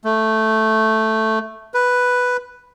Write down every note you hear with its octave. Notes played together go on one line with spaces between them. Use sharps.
A3
B4